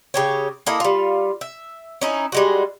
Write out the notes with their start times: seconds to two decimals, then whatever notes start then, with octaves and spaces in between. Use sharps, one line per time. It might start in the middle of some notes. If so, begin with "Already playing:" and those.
0.14 C#3 G4 C#5
0.66 A#3 E4 A4 D#5
0.80 G3 F4
1.41 E5
2.01 C#4 D#4 E4
2.32 G3 G#3 F#4